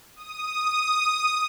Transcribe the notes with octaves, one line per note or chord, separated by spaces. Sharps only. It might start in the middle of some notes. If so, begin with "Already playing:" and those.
D#6